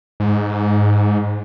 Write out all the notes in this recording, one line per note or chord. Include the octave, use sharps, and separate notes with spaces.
G#2